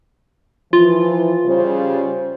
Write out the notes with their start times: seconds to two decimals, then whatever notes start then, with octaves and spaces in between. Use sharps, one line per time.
0.73 E3 F3 F4
1.45 C#3 G3 C5